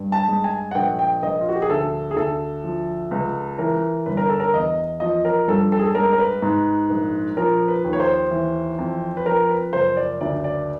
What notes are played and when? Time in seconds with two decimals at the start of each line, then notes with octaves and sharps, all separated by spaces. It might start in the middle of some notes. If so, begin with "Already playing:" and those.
Already playing: G2
0.12 A5
0.28 G#3
0.44 G#5
0.71 F#5
0.75 A#1 G5
0.99 G5
1.22 A#1 D#5
1.41 F4
1.49 F#4
1.55 G4
1.62 G#4
1.70 D2 A4
2.11 G#4
2.16 D2 A4
2.64 F3
3.11 C#2
3.58 E3 A#4
4.06 G1 B4
4.17 A#4
4.29 A4
4.40 A#4
4.53 E2 D#5
5.00 F3 D#5
5.25 A#4
5.48 G2 A4
5.72 A4
5.79 G#4
5.85 A4
5.95 G#3 A#4
6.13 A#4
6.19 B4
6.42 G#2
6.90 A#1
7.37 F3 A#4
7.68 B4
7.84 D#2
7.93 C#5
8.00 C5
8.31 E3
8.79 F2
9.17 B4
9.26 F3 A#4
9.49 B4
9.73 F#1 C5
9.97 D5
10.21 D2 D5
10.44 D5